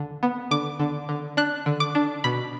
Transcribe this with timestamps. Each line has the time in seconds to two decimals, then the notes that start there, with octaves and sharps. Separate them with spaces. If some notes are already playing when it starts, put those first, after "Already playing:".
Already playing: D3
0.23 B3
0.51 D3 D6
0.80 D3
1.09 D3
1.37 D4 F#6
1.66 D3
1.80 D6
1.95 D4
2.24 B2 B5